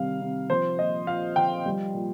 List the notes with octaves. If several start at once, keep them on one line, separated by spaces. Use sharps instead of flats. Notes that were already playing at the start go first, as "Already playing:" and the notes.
Already playing: C3 D#3 G3 F5
C3
F3 C5
A#2 D#5
A#2 F5
F3 G5
G3
A#2